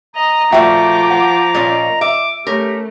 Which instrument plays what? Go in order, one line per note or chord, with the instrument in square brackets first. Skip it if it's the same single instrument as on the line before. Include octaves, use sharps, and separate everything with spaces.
[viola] D#5 [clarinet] A#5
[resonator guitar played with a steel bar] A#2 A3 F#4 [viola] F3 D6 [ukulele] E5 G5
[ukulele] F#5
[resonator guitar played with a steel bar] A#2 A#3 C#4 [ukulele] D5 D#5
[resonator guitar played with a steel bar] E5 [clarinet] D6
[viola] A3 [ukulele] C#4 [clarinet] G4 [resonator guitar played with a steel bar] A#4